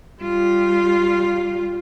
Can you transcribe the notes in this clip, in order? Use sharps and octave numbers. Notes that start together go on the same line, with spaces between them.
G3 F4